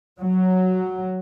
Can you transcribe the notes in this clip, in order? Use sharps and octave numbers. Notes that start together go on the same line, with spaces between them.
F#3